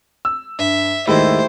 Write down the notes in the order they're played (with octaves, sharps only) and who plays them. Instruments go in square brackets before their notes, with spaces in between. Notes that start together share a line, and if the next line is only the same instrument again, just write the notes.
[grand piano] E6
[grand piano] G2 [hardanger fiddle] E5
[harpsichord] D#2 G#2 D#3 [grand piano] A3 E4 G4 [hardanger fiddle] C5